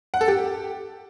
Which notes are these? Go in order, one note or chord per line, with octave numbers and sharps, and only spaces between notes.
F#5
A4
G4